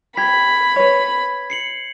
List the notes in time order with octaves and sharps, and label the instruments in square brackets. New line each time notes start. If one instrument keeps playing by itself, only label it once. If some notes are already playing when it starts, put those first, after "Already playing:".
[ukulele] G4 [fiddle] B5 [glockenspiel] G#6 B6
[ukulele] B4 C#5
[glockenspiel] C7 C#7 F#7